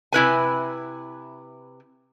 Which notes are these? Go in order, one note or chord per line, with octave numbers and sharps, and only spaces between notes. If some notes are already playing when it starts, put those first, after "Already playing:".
C3 E4 B4 G#5